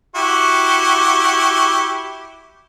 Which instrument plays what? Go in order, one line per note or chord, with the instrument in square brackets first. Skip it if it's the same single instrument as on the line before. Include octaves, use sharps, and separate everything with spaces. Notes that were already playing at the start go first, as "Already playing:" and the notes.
[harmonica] E4 F#4 G4